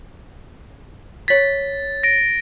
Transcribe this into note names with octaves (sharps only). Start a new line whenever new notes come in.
C#5 A6 B6
A#6 D7